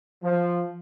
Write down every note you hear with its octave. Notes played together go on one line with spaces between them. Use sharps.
F3